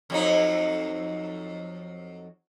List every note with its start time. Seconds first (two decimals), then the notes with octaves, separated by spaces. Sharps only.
0.10 F2 F#3 D#4